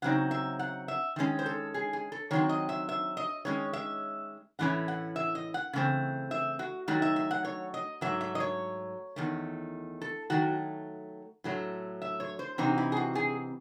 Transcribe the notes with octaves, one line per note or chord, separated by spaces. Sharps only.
C#3 F#3 C4 D#4 F#5
E5
F#5
E5
D#3 G#3 C#4
C5
A4
G#4
G#4
A4
D#3 F#3 C4 C#5
D#5
E5
E5
D#5
D#3 G#3 C#4 C#5
E5
A2 E3 A3 C#4 E4 F#5
F#5
E5
D#5
F#5
C#3 E3 A3 C4
E5
F#4
D#3 F#3 A3 D#4 F#4
E5
E5
F#5
C#5
D#5
G#2 F#3 A3 E5
E5
D#5
C#5
E2 D#3 A3
A4
D#3 F#3 A3 F#4
A2 F#3 A3
E5
C#5
C5
C3 E3 C4 D#4 F#4
E4
G#4
F#4
G#4